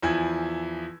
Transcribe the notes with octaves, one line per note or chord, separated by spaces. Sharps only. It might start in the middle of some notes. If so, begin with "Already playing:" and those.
E2 F3 E4 G#5 E6 G#6